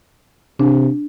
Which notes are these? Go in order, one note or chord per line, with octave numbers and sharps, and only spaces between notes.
C3 D4